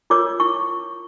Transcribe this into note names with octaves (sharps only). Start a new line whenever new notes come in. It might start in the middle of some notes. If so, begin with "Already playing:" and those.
F4 A#4 C#5 D6
E4 C#6